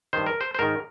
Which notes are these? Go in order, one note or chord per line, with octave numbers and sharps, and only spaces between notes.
G2 D#3 C5
A#4
C5
C5
G#2 D#3 A#4